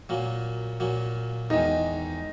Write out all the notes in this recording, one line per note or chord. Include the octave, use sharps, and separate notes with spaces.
A#2 F#3 A#3
A#2 F#3 A#3
E2 D#3 G#3 D#4